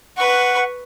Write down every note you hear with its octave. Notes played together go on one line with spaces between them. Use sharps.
B4 F#5 C#6